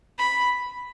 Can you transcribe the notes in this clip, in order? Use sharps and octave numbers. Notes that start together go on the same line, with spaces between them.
B5